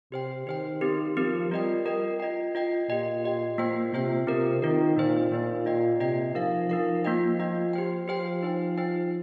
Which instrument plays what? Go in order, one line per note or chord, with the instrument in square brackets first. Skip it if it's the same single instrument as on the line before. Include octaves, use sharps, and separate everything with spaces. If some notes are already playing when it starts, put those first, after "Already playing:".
[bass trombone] C3 [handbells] G4 C5 G5
[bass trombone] D#3 [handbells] G4 C5 G5
[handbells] C4 G4 A#4
[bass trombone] F3 [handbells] C4 G4 A#4
[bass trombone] G3 [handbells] F4 A#4 D#5 G5
[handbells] F4 A#4 D#5 G5
F4 D#5 G5
F4 D#5 G5
[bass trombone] A#2 [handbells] G4 D#5 G5
[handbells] G4 D#5 G5
[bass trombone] A#2 [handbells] A#3 F4 C5 G5
[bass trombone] C3 [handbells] A#3 F4 C5 G5
[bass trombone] C3 [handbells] C4 F4 A#4
[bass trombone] D#3 [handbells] C4 F4 A#4
[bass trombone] A#2 [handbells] A#3 D#4 C5
[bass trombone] A#2 [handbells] A#3 D#4 C5
[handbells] F4 D#5 G5
[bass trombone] C3 [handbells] F4 D#5 G5
[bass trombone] F3 [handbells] D#4 A#4 F5
[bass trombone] F3 [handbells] D#4 A#4 F5
[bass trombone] F3 [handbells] A#3 F4 D#5 G5
[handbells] A#3 F4 D#5 G5
G4 C5 G5
[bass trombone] F3 [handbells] G4 C5 G5
[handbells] D#4 C5 G5
D#4 C5 G5